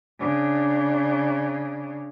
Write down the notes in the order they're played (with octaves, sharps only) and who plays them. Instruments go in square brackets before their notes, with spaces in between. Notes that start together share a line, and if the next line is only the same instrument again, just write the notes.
[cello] C#3 D4